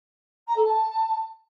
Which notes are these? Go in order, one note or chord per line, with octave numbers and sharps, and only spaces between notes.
A#5
A4
A5